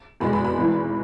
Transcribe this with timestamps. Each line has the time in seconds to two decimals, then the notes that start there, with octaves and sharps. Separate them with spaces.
0.20 F1 E2 B2 G#3 B5
0.33 B5
0.45 B5
0.56 G#1 G#2 E3